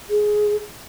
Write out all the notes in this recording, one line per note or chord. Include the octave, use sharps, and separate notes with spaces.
G#4